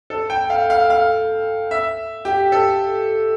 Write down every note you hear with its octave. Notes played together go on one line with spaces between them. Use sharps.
A4
G5
F5
F5
F5
E5
G4
A4